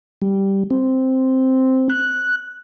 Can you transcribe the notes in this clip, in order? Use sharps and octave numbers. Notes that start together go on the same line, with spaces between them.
G3
C4
F#6